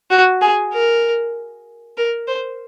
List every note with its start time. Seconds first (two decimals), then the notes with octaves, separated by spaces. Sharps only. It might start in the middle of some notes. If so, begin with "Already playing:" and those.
0.11 F#4
0.42 G#4
0.73 A#4
1.97 A#4
2.27 C5